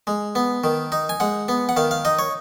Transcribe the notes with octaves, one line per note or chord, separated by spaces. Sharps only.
G#3
B3
D#3
D#4
G#5
G#3 F#5
B3
F#5
D#3 F5
F5
D#4 D#5
C#5